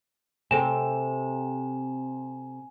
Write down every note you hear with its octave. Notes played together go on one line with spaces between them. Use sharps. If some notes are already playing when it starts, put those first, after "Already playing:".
C3 C4 A4 G#5 E7